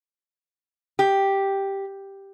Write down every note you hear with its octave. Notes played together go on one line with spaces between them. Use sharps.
G4